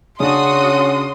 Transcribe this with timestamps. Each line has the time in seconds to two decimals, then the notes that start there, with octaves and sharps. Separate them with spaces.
0.20 C#3 C#4 D4 F#4 C6 D#6